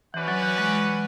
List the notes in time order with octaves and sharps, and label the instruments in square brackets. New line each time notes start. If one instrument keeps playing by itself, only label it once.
[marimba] E3 [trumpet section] C#4 F#4 B4 D5 F#5
[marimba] F#3
E3
G#3
G#3